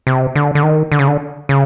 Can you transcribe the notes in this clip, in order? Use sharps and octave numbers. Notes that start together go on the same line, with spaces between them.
C3
D3
D3
D#3
D3
C#3
D3
C#3